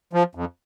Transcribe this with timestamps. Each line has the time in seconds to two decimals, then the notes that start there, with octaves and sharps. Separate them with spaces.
0.13 F3
0.35 F2